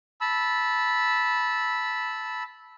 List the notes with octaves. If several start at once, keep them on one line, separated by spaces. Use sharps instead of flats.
A5 B5 E6